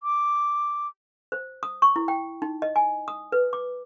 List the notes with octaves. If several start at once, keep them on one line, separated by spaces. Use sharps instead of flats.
D6
C5
D#6
C#6
E4
G5
D#4
D#5
G#5
D#6
B4
D6